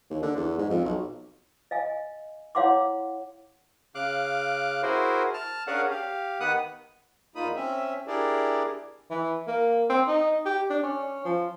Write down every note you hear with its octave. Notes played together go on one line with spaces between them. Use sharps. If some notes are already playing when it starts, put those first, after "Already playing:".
D#2
D3
E2
G#2
F2
B1
D#5 F5 G#5
E4 C#5 F5 F#5 C6 D6
C#3 F5 D6 F#6
E4 F#4 G#4 A#4 C5
A5 F6
C#4 D4 G#4 A#4 F5 F#5
G4 F5
D#3 B3 B4 F#5 D#6 F#6
E2 A#3 D#4 F4 B5 D#6
C4 C#4 E5
D4 E4 G4 G#4 A#4 D5
E3
A#3
C4
D#4
G4
D4
C#4
F3